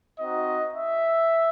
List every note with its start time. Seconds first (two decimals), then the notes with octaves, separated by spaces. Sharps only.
0.19 C4 D#4 F#4 D#5
0.74 E5